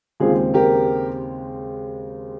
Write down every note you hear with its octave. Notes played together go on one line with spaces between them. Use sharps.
D#2 C#3 G#3 C4 F4 G#4
G4 A#4